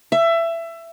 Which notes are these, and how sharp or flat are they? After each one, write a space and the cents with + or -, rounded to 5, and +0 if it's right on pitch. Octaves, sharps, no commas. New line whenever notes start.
E5 +20